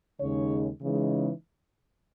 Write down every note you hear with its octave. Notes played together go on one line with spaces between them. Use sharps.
D#2 C#3 G#3 D#4 C#5
C#3 E3 G#3 D#4